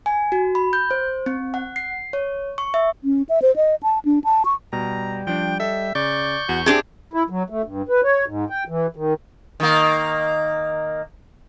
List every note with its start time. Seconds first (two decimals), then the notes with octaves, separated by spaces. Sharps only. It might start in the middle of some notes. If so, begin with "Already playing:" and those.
0.06 G#5
0.32 F#4
0.55 B5
0.73 G6
0.91 C5
1.26 C4
1.54 F#5
1.76 C7
2.13 C#5
2.58 C#6
2.74 E5
3.04 C#4
3.29 E5
3.42 C5
3.56 D#5
3.83 A5
4.05 D4
4.24 A5
4.45 C#6
4.73 B2 G3 A#5
5.27 F3 D4 G5
5.60 A4 D#5 E5
5.95 C#3 D5 C#6 G6
6.49 E2 F#4
6.66 C4 D4 G4 G#4 E5 G#5 C6
7.13 E4
7.30 F#3
7.50 A3
7.65 G2
7.89 B4
8.03 C#5
8.28 G#2
8.50 G5
8.68 E3
8.96 D#3
9.60 D#3 A#3